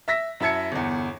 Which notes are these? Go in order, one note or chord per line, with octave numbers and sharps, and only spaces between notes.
E5 E6 A#6 B6
F#2 E4 E5 A5 G#6 C#7
G1 E2